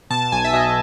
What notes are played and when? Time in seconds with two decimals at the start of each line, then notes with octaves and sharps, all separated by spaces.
0.10 B2 A5
0.32 B1 G#5
0.44 E5
0.53 B2 D#5